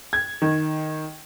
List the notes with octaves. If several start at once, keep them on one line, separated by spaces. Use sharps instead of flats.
G#6
D#3